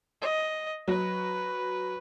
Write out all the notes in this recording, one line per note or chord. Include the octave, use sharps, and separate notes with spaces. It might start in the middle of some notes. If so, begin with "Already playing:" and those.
D#5
F#3 B4